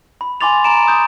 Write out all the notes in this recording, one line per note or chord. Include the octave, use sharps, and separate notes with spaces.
B5
G#5 B5 C6 D6 A6 F7
A#5 D7 E7
D#6 G6